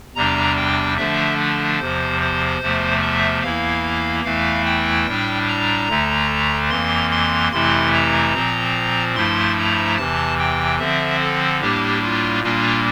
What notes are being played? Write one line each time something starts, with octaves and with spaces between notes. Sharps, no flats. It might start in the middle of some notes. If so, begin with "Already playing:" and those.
E2 C3 G3 D4 A#5
G5
D3 F3 A3 D4 E5
E2 C3 F3 C5
C5
E2 C3 F3 A3
E5
E2 E3 A#3 E4 F5
E2 E3 A3 E4 F5
G5
A2 G3 D4
A#5
D2 D3 A3
F2 E3 A#3 C6
C6
F2 C3 E3 A3 E4 C6
A#5
A#2 F3 C4
G2 F3 A3 E4 C6
A#5
E2 C3 E3 A5
G5
D3 F3 C4 E5
A4
A2 G3 A#3 D4 G4
F4
A#2 G3 A#3 D4 F4